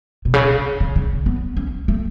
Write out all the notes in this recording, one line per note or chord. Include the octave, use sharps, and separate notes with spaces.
B2
C#3
C#3
D3
B3
C#4
A3